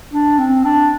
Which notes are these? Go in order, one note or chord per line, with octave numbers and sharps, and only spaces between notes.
D4
C4
D4